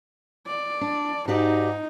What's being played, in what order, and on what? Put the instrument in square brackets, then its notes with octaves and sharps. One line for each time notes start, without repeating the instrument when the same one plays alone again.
[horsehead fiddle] D5
[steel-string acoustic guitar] D4
[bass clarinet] G#2 [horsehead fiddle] D#4 [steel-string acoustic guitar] F#4 G4 D5